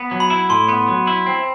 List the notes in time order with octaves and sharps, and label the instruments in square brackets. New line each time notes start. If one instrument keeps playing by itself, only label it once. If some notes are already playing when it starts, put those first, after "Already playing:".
Already playing: [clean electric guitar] B3
F#3
[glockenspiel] B5
[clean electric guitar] E4
[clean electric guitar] A2 [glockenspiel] C6
[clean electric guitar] B3
F#3
E4
C4